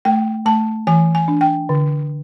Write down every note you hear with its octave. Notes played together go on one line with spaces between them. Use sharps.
A3 G5
A3 A5
E3 G#5
G#5
D4
G5
D3